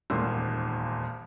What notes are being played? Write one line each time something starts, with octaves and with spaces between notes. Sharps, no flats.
D#1 G#1 E2 A#3 C6 E6